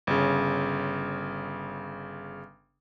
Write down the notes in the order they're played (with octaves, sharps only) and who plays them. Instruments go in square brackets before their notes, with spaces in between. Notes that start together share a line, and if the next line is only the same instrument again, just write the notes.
[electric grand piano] G1 C#3